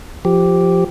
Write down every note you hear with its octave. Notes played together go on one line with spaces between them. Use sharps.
F3 G4